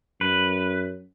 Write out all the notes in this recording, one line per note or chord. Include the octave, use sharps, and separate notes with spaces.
F#2 B4